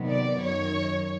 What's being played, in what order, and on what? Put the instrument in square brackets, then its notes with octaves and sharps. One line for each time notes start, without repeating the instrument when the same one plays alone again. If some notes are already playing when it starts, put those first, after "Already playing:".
Already playing: [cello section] C3 D#3 F#3 B3
[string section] D5
[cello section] F#2 D#3 [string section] C#5